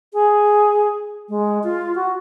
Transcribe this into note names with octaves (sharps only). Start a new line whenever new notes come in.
G#4
G#3
F4
F#4